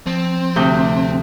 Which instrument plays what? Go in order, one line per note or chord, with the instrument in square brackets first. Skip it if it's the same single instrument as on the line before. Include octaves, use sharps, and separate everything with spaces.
[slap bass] F3 [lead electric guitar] C4
[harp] D2 C3 G6